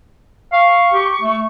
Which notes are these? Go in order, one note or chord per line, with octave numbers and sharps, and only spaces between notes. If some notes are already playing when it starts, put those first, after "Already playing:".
F5 C#6
G4
A3